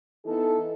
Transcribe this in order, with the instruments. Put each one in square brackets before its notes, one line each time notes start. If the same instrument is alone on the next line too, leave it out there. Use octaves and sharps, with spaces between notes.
[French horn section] E3 B3 D#4 A4